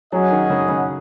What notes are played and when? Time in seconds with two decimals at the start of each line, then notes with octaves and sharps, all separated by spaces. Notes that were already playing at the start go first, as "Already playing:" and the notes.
0.12 F#3 C#4 G#4 D#5 F#5
0.31 D#3
0.50 C#3
0.69 C#3